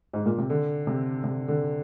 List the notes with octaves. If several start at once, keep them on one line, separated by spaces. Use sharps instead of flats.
G#2
A#2
C3
D3
C3
C3
D3